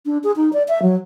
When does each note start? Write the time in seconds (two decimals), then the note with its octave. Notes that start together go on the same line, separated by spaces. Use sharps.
0.06 D4
0.24 G#4
0.36 D#4
0.53 D5
0.68 E5
0.82 F#3